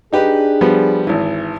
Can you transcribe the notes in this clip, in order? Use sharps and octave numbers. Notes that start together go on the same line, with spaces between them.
D4 D#4 G4 G#4 B4
F3 G3 B3
G#1 E3